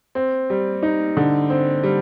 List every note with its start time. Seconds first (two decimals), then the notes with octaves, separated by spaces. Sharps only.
0.15 C4
0.50 G3
0.83 D#4
1.17 D3
1.50 C4
1.83 G3